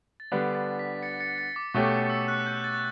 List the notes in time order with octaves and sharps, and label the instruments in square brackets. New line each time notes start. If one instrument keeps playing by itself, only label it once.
[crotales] A6
[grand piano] D3 G3 B3 D4 [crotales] B6
[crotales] A6
B6
A6 C#7
A6 C#7
A6
D6
[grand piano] B2 A3 C#4 G4 [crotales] C#6
[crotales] D6
E6
F#6
G6
G6
A6